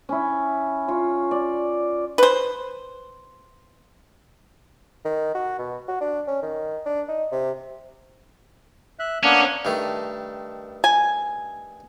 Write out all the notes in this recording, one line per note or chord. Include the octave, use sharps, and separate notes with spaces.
C#4 E4
F4 C#5
D5
B4 C5
D#3
F#4
B2
F#4
D4
C#4
D#3
D4
D#4
C3
E5 F#6
A#3 B3 C#4 D4
G2 D#3 A3
G#5